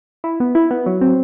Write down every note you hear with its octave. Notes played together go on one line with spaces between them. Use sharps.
E4
B3
E4
B3
F#3
C4